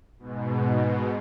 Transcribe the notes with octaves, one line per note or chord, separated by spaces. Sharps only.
G#2 B2